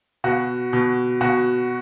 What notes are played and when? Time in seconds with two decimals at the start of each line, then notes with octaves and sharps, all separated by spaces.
0.24 B2 F#4
0.73 B2
1.21 B2 F#4